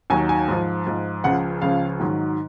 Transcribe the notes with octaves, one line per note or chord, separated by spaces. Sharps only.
D#2 D#3 F#3 G#5
G#5
G#2 F3
G#2 F3
C#2 C#3 F3 F#5
C#2 C#3 F3 F5
G#2 D#3 F#3